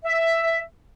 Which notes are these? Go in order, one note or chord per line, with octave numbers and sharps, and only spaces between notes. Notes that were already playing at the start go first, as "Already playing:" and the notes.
E5